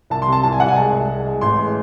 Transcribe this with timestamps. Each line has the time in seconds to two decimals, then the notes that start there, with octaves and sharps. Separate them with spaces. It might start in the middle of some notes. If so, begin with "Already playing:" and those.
0.10 C2 A5
0.22 C6
0.28 C3 A5
0.43 C2 A5
0.52 G#5
0.60 C2 F#5
0.68 G#5
0.76 G#3 A5
0.92 C2
1.09 G#3
1.26 G#3
1.41 A1 C6
1.59 G#3